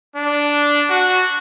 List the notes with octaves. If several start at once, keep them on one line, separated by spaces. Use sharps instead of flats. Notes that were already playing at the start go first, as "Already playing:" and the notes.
D4
F#4